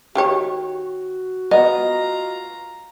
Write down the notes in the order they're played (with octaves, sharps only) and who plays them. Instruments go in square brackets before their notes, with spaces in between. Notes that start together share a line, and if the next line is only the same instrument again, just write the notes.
[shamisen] D#3 G4 C#5 [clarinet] F#4
[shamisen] B3 [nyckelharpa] F4 A#5 [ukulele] D#5